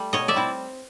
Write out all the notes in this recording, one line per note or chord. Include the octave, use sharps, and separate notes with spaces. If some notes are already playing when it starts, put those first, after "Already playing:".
Already playing: G3 A3
B2 C#5 D#5
D5 E5
G3 C4 E4